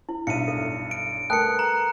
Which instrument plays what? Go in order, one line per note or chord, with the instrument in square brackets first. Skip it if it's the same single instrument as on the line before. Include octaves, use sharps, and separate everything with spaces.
[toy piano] E4
[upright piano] B1 G2 [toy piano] E5 F5 [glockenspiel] C#7 D#7
[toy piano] A4
[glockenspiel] D7
[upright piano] A3 A#4 B4 [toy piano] G5 A5 D#6 [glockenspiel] F#6 C#7
[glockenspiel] A#5